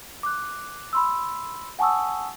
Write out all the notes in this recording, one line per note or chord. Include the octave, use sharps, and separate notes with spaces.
D6 F#6
B5 C6 E6
F#5 G#5 A5 C#6 D#6 E6